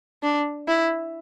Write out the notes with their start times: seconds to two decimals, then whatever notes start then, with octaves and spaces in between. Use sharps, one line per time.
0.23 D4
0.68 E4